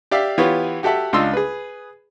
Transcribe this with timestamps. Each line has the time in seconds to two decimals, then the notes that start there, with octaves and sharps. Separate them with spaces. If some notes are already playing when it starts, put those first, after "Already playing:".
0.11 G4 D5 E5 F5
0.38 E3 B3 F4 G4 B4 C#5
0.83 F#4 G4 A4 E5 F#5
1.13 C#2 D4 F4 D#5 C6 E6
1.33 G#4 B4